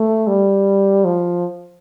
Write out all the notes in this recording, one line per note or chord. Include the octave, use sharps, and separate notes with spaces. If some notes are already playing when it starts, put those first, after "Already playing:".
Already playing: A3
G3
F3